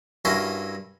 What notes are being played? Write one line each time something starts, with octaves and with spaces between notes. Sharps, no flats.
G2 C#4 E4 F#4 A#4 C6